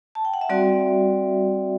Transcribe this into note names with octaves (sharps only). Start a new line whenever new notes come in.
A5
G5
F#5
E5
G3 C4 F#4 D5